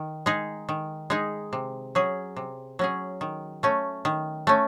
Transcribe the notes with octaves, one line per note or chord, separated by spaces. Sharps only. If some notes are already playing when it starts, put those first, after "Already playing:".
Already playing: D#3
G#3 D#4 G#4
D#3
G#3 D#4 G#4
C3
F#3 C#4 G#4
C3
F#3 C#4 G#4
D#3
A3 C#4
D#3
A3 C#4